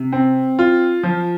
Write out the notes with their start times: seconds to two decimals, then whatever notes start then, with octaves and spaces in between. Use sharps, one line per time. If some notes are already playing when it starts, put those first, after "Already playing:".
Already playing: C3
0.12 C4
0.59 F4
1.03 F3